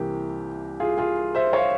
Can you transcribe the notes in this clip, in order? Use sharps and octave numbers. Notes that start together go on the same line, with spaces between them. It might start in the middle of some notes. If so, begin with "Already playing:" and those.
Already playing: C2 C3 E3 A#3 G4
F4 G#4
F4 G#4
C5 E5
C#5 F5